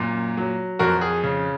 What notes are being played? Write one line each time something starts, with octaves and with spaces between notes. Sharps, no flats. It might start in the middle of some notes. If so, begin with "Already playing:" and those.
Already playing: F#2 A#2
F#3
F2 F#4 A#4
G#4
C#3